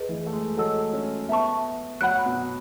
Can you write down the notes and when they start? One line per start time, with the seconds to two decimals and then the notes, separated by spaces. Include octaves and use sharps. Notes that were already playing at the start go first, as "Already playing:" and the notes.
Already playing: G#4 B4 D#5
0.09 E3
0.26 A3
0.33 G#3
0.57 F#3 A4 D#5 A5 E6
0.93 C#4
1.29 B3 E5 A5 C#6
2.01 F#3 F#5 B5 F#6
2.26 B2